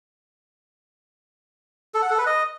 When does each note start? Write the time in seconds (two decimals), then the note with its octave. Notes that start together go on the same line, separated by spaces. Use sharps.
1.94 A4
2.02 F#5
2.10 A4
2.18 B4
2.26 D#5